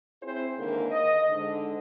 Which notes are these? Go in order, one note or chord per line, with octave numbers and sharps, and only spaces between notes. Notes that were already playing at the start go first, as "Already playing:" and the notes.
C4 E4 G#4 C5
D#2 G#2 D3 E3 A#3
D#5
G#2 D3